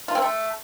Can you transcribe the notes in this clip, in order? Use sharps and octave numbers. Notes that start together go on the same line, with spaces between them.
F4
C4
A3